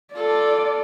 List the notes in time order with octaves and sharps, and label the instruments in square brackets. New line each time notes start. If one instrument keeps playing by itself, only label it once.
[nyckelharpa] F4 A4 [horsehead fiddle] D5